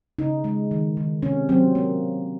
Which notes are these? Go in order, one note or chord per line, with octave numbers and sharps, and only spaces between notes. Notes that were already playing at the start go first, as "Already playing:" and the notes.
C#3 D#4
G#3
D#3
D#3
C3 C#4
F#3 C4
A#3